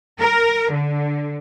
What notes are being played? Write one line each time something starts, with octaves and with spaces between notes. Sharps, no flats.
A#4
D3